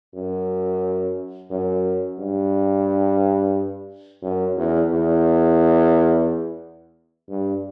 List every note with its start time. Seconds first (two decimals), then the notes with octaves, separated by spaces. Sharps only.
0.14 F#2
1.50 F#2
2.19 G2
4.22 F#2
4.57 E2
4.90 E2
7.29 G2